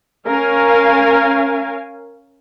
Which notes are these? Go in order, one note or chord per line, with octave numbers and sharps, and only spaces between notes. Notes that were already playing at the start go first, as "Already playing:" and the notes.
C#4 A#4 F5 G#5